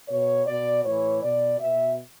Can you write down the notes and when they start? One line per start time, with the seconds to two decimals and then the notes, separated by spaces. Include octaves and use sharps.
0.08 B2 C#5
0.46 B2 D5
0.84 A2 E3 C#5
1.22 B2 D5
1.60 B2 E5